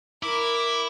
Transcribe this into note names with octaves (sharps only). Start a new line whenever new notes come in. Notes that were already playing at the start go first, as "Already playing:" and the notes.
E4 A#4 D6